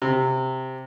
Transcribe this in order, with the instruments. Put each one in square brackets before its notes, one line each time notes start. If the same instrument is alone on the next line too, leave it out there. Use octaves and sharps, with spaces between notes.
[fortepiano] C3